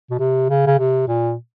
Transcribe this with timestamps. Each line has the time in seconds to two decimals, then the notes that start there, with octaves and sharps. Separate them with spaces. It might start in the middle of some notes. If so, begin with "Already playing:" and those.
0.11 B2
0.19 C3
0.49 C#3
0.67 C#3
0.78 C3
1.07 A#2